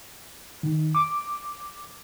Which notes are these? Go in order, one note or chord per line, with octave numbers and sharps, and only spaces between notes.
D#3
D6